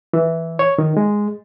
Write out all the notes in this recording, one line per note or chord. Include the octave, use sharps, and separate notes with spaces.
E3
C#5
D#3
G#3